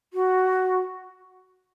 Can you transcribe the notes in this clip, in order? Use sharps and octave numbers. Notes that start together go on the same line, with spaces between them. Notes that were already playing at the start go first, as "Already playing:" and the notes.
F#4